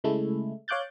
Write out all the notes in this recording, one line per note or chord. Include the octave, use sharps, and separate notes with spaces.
C#3 G#3 A3 E4
C#5 F5 D6 F#6 G6 A6